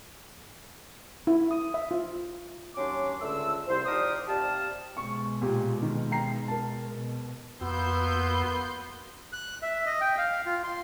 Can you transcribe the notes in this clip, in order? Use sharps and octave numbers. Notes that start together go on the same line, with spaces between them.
E4
D#6
E5
F4
D#2 F#3 C#4 D4 C6 D6
C#2 D3 A3 E6
C2 C5
F3 D4 D#4 G4 A#4 D#6
C3 G4 D5 F5 A5
B2 G#3 C#6
A#2 G4
D#3
G5 A#5 C7
A#4 A5
B2
F2 A#3 B3 F#4 C6 E6 G6
F#6
E5
D#5
G5
F5
F4
C6